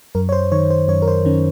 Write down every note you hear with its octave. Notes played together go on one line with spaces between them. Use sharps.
F#2 A#4
C#5
C5
D#3 C#5
C5
F#2 C#5
A#4
C5
D#3 C#4